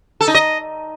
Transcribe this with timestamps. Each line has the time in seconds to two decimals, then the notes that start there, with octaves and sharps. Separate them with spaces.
0.21 A4
0.28 D#4
0.35 D#5